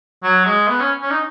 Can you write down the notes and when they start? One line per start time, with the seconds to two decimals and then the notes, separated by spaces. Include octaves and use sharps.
0.23 F#3
0.46 G#3
0.68 B3
0.80 C#4
1.02 C#4
1.11 D#4